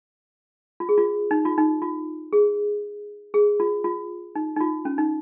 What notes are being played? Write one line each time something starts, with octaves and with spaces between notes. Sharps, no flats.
F4
G#4
F4
D#4
F4
D#4
F4
G#4
G#4
F4
F4
D#4
D#4
F4
C#4
D#4